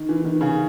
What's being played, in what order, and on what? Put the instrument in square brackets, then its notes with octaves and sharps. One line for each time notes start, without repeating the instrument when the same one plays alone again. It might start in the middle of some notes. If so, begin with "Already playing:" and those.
Already playing: [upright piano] D#3
E3
D#3
C#3